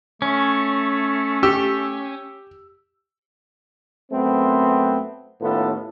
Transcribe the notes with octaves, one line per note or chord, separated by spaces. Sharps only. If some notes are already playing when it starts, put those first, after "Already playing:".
A3 C#4
G4 E6
F#2 A3 B3 C4
D#2 A2 B3 C#4 F4 A4